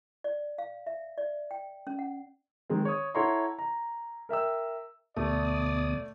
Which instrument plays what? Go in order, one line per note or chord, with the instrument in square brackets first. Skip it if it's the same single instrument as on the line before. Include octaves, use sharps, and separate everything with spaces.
[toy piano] D5
F5
E5
D5
G5
C#4
F#5
[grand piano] D#3 G#3 C4
C#5 D#6
E4 A4 C#5 F#5 A#5 C6
A#5
A#4 E5 G5 E6
[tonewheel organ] D2 B2 D#6 [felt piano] A3 [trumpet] D5